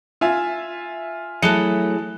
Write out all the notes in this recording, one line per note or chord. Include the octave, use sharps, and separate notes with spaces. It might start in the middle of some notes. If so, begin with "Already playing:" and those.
F4 E5 G#5
F#3 A3 E4 G#4 A5 F#6 C#7